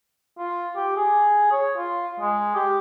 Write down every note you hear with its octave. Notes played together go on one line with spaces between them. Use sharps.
F4
G4
G#4
C#5
F4
G#3
G4